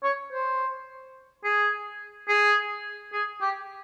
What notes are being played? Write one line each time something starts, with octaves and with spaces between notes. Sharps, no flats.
C#5
C5
G#4
G#4
G#4
G4